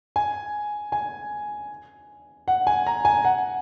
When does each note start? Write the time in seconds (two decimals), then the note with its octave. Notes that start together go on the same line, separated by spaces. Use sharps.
0.16 G#5
0.92 G#5
2.48 F#5
2.67 G#5
2.86 A#5
3.05 G#5
3.25 F#5